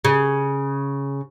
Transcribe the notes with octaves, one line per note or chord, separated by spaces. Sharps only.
C#3